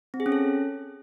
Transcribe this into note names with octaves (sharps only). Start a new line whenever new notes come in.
C4
G#4
C#4
A4